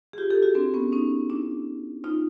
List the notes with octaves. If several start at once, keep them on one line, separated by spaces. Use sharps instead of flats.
G#4
F4 G4
G4 A4
F#4 G#4
C4 D4
B3 C#4
C#4 D#4
D4 E4
D#4 F4